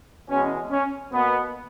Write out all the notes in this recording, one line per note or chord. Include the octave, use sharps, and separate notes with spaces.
E2 B2 G#3 C#4
C#4
B2 A#3 B3